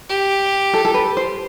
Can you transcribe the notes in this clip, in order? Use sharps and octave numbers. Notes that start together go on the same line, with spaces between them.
G4
A4
A4
B4
C5